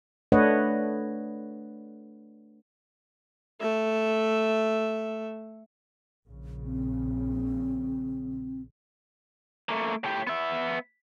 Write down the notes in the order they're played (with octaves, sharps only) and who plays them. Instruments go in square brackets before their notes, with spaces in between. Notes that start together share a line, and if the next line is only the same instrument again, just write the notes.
[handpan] A3 D4 B4 C#5 D#5 F#5
[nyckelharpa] A3 E5
[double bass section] A#1 C#3
[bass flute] C4
[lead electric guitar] A3 A#3
A2 G4
B3 E5